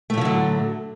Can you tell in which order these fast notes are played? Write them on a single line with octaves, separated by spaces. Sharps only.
A3 A2 F3 D3 F#3